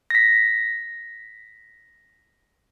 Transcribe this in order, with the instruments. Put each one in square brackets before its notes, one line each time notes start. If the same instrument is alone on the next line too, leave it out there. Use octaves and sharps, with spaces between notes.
[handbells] A#6 B6